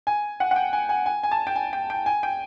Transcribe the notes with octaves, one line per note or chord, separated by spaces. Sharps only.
G#5
F#5
F#5
G5
G#5
G#5
G#5
G#5
A5
G5
G#5
G5
G5
G#5
G5